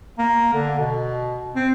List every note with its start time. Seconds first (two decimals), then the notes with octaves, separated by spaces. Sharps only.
0.18 A#3
0.53 D3
0.79 B2
1.56 C4